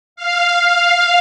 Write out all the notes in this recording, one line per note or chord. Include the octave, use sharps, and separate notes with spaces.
F5